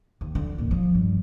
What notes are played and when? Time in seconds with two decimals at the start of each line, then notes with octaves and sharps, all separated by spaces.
0.21 D#2
0.35 D3
0.58 A1 D#2
0.71 F3
0.95 G2